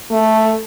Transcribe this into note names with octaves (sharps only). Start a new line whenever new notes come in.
A3